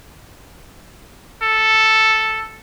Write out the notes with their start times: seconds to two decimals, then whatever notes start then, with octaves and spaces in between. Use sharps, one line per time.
1.43 A4